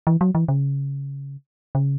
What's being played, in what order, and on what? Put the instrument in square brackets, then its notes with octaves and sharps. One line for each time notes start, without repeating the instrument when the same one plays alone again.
[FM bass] E3
F#3
E3
C#3
C#3